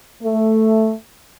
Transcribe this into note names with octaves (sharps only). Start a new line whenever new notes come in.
A3